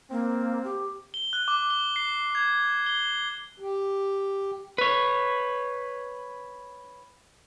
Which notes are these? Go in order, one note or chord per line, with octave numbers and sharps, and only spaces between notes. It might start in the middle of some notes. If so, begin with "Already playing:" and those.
A#3 C4
G4
G7
F#6
D6
G7
C7
G#6
G7
G4
B4 C#5